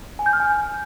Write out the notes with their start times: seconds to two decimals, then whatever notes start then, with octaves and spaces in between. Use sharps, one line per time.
0.19 G#5
0.26 G6
0.33 F6
0.40 G#5